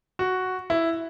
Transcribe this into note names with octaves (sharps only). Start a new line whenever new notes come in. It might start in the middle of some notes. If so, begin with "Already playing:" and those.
F#4
E4